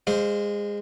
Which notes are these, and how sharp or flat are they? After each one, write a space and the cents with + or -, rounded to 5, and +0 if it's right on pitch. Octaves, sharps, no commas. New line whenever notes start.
G#3 -20 C5 +0 F5 -5